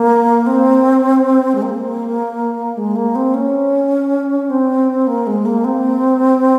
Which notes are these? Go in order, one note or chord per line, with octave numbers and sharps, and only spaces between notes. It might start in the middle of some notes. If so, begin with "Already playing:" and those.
Already playing: A#3
C4
G#3
A#3
G#3
A#3
C4
C#4
C4
A#3
G#3
A#3
C4